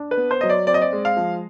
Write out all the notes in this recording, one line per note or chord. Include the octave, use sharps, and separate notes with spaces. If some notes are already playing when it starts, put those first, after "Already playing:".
Already playing: D4
B4
B3
C5
F#3 D#5
D5
C4 D5
D#5
D5
G#3
F5
F3